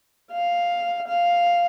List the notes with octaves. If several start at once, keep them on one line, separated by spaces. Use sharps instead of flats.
F5
F5